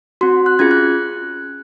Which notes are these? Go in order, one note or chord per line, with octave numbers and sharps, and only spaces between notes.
C4 F#4 C6
F#6
C#4 F4 G#4 G#6
F#6